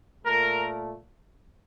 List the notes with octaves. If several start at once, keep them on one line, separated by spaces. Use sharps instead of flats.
A#2 A3 A#4